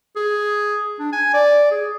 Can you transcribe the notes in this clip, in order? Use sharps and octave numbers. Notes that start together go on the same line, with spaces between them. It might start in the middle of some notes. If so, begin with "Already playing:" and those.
G#4
D4
G#5
D5
G#4